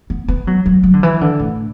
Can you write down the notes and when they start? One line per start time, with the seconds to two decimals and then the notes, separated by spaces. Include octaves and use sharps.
0.10 B3
0.28 B3
0.47 F#3
0.66 F#3
0.84 F#3
0.94 D3
1.03 E3
1.21 D3
1.40 A2